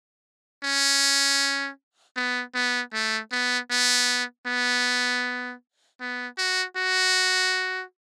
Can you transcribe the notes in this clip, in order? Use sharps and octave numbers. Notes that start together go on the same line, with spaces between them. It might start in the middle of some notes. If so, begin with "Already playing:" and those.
C#4
B3
B3
A3
B3
B3
B3
B3
F#4
F#4